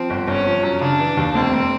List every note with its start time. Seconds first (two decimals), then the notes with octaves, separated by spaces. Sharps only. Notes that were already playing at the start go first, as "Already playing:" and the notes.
Already playing: F3 C4
0.10 G1
0.28 G1 C#4
0.46 F3
0.63 F#2
0.81 C#3 D4
0.99 E3
1.17 D#2
1.34 F1 C4
1.52 F1